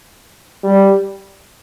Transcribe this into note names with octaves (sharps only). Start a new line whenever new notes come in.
G3